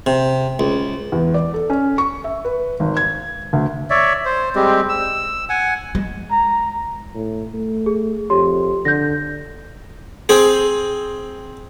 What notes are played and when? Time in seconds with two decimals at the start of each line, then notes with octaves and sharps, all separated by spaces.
0.06 C3
0.59 C#2
1.12 E2
1.34 D5
1.54 A4
1.70 C#4
1.98 C#6
2.24 E5
2.45 B4
2.80 G#1
2.97 G#6
3.53 D2
3.90 C#5 D5 E5
4.25 C5
4.56 G3 G#3 C4 G4
4.89 E6
5.49 F#5 G#5
5.95 G#3
6.31 A#5
7.15 A2
7.54 A3
7.86 G#4
8.30 F2 G4 C#5 C6
8.85 D3 G6 A#6
10.29 C4 G#4